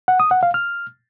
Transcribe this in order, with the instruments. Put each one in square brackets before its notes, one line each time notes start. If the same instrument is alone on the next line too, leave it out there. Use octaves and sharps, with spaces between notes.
[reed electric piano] F#5
D#6
F#5
F5
F6